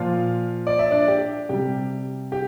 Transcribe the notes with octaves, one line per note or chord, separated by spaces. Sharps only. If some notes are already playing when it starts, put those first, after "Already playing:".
Already playing: A#2 F3 F4 F5
D5
E5
D4 D5
G4
C3 G3 G4
G4